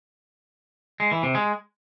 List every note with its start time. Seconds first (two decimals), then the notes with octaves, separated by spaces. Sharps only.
1.00 G#3
1.12 E3
1.23 C3
1.35 G#3